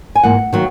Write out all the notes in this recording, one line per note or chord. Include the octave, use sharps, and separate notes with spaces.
G#5
G#2 E3 A#3 F#5
D#3 F#3 A#3